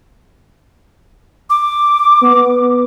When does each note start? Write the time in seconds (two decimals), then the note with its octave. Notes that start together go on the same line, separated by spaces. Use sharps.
1.50 D6
2.21 B3